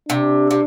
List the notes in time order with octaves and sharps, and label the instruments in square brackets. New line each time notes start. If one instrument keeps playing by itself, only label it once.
[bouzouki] C3 [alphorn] D4
[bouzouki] C3